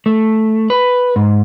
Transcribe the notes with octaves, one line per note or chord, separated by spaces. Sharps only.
A3
B4
G#2